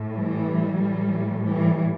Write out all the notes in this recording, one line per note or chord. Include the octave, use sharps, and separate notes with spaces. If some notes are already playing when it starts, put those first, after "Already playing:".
Already playing: A2
E3 G3
A2 E3
E3 G3